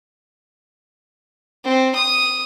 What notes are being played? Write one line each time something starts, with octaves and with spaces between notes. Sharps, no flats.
C4
D#6